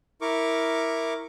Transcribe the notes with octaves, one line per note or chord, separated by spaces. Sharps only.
E4 A#4 C#6 D6